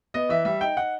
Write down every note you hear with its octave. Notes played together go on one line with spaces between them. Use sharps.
B3 D#5
E3 E5
G3 E5
D#4 G5
D#4 F#5